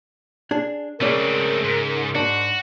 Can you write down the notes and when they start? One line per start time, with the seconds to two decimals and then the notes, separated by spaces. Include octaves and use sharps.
0.51 D4 G#4
1.01 C#3 G#3 A3 C4 C#4 A#4 D5
1.64 G#2
2.15 G#2 D4 F#4